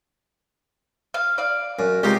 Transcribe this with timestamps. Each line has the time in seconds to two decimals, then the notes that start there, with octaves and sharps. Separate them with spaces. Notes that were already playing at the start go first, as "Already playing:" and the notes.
1.14 F5
1.38 D5 F5
1.79 F#2
2.03 C#2 C3 D#4 G4